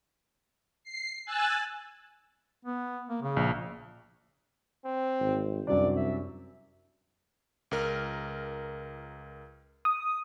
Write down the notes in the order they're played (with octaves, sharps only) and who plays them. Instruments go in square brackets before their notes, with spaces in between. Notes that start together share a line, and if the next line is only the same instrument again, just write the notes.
[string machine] C7
G#5 E6 F#6 A6
[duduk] B3
A#3
C#3
[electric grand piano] A#1
[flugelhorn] C4
[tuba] G#1
[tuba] C2 [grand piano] F#2 F#3 D4 [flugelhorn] D5
[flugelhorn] E5
[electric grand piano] C#2 A#4 F6
[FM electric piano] D#6